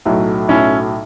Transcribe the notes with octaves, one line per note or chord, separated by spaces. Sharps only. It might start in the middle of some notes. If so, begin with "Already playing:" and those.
B1 A2 F#3
B1 A2 F#3 C#4 E4